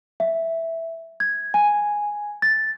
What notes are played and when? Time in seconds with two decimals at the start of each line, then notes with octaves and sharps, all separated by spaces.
0.20 E5
1.20 G#6
1.54 G#5
2.42 A6